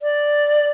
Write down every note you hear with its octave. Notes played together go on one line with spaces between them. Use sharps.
D5